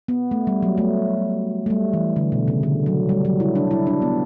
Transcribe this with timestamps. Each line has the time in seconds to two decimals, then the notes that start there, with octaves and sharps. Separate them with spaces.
0.08 B3
0.31 A3
0.47 G3
0.63 F#3
0.78 A3
1.66 A3
1.70 G3
1.93 E3
2.16 D3
2.32 B2
2.48 C#3
2.63 D3
2.86 F#3
3.09 G3
3.25 F#3
3.40 E4
3.56 D4
3.71 E4
3.87 D4
4.02 B3